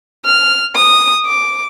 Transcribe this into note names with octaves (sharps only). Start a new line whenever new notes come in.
F6
D#6
D6